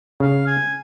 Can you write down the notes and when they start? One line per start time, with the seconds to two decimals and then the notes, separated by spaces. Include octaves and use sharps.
0.20 C#3 F5
0.47 G#5